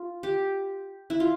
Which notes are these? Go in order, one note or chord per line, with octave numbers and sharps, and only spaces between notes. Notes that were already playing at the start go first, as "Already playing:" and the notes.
Already playing: F4
G4
E4
F4